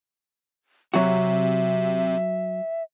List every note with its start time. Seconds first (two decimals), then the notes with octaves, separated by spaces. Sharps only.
0.94 C3 F#3 F#4 E5